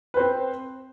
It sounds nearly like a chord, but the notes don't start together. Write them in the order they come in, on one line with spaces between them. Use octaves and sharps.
B4 C5 C4